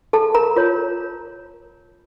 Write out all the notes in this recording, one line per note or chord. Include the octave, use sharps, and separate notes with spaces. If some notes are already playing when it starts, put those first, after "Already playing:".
A4 A5
A#4 A#5
F4 A#4 C#5